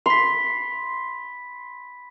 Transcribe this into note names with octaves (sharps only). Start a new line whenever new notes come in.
B5 C6 B6